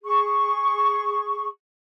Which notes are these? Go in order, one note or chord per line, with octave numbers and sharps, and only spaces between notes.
G#4 C#6